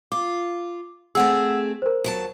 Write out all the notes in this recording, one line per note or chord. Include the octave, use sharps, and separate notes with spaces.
F4 D6
A3 C4 G#4 F#5 E6
A#4 C5
D#2 F#3 A5